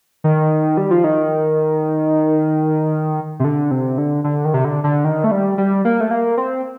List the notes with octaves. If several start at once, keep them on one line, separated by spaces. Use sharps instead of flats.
D#3
G3
F3
D#3
C3
D3
C3
D3
D3
D#3
C3
D3
D3
D#3
A3
G3
G3
A#3
A3
A#3
C4